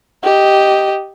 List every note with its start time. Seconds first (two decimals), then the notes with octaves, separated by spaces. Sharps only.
0.24 G4 D#5